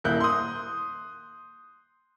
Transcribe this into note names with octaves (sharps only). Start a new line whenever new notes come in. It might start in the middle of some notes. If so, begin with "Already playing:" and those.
D#1 A#3 E4 F#6 G6
C6 D#6